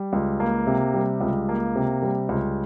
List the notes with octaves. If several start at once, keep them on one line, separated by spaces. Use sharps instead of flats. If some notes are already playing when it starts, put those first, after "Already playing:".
Already playing: G3
C#2
A#3
C3
G3
C#2
A#3
C3
G3
C#2